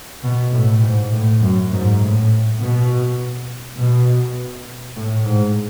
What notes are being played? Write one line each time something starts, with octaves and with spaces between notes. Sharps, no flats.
B2
A2
G#2
A2
F#2
G#2
A2
B2
B2
A2
G#2